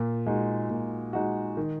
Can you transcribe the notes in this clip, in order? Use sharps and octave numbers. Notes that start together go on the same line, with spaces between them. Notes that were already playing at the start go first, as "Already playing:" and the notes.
Already playing: A#2
G#3 D#4 F#4
A#2
G#3 D#4 F#4
D#3